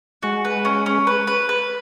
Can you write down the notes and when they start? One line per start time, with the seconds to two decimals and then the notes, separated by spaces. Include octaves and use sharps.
0.23 G#3 F#4
0.45 B4
0.65 C#4
0.86 C#4
1.07 B4
1.27 B4
1.49 B4